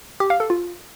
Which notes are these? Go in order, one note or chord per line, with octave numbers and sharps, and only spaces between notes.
G4
F5
A4
F4